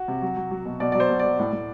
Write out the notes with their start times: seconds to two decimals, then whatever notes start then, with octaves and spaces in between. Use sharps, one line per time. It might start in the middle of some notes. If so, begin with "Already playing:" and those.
Already playing: F#4
0.08 C3
0.22 F#3
0.36 F#3
0.51 F#3
0.66 B2
0.80 B2 D5
0.92 F#3 D5
1.00 C5
1.10 B2
1.19 D5
1.25 F#3
1.39 A2
1.53 A2